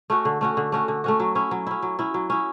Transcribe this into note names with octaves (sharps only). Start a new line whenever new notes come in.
A3 C#4 F#4
D3
A3 C#4 F#4
D3
A3 C#4 F#4
D3
A3 C#4 F#4
F#3
C#4 E4
F#3
C#4 E4
F#3
C#4 E4
F#3
C#4 E4